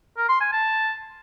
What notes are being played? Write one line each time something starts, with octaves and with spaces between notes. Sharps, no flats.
A#4
C6
G#5
A5